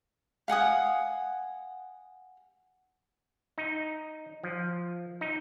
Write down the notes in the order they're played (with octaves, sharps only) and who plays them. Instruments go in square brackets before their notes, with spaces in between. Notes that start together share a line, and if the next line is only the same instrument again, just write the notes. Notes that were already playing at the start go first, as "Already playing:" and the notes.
[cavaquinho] F5 F#5 G#5 D#6
[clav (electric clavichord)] D#4
F3
D#4